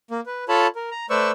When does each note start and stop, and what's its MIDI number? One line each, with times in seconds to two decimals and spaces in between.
0.11 0.20 58
0.26 0.44 71
0.49 0.67 65
0.49 0.67 69
0.49 0.67 73
0.49 0.67 81
0.49 0.67 83
0.76 0.90 70
0.91 1.06 82
1.10 1.31 57
1.10 1.31 71
1.10 1.31 72
1.10 1.31 74
1.10 1.31 85
1.10 1.31 88